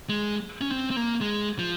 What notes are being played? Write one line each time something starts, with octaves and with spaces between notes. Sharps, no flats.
G#3
C#4
C4
C4
A#3
G#3
F3